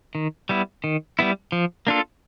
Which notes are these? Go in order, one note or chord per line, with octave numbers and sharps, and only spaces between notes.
D#3
G3 B3 E4
D#3
G3 B3 E4
F3
A#3 D4 F4 A4